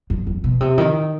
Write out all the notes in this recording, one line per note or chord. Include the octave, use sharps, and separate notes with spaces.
F#2
F#2
B2
C3
D#3